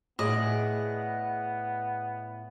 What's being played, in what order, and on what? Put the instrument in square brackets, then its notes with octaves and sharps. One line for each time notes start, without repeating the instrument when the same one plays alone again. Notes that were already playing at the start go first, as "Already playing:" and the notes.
[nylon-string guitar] A2 [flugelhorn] B3 [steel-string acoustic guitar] G#4 D5 [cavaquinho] D#5